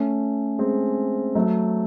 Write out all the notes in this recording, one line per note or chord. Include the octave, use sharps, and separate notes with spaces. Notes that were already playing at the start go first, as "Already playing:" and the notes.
Already playing: A3 C#4
G#3 C4
F#3 A3